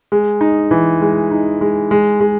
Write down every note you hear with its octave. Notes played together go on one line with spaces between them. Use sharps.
G#3
D#4
E3
G#3
D#4
G#3
G#3
G#3